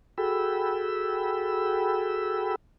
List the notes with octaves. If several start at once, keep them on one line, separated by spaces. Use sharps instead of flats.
F#4 G#4 A4 G5 B5 E6